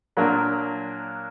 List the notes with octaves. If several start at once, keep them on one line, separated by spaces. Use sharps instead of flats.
A#2 F#3 A#3 D4